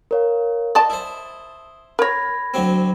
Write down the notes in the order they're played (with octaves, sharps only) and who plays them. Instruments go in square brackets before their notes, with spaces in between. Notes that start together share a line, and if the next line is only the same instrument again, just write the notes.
[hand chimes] A#4 C#5 F5
[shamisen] D5 D#5 A5 [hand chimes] D#6
[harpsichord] E4 C5
[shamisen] A#4 C#5 [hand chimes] B5 G#6 A#6
[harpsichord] D2 F#3 C4